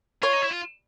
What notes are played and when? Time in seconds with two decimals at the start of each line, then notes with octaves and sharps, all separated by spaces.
0.23 F4 C#5
0.33 D#4
0.42 E4
0.51 F4